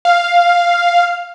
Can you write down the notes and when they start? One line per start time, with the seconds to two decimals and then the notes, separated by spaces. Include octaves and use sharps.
0.05 F5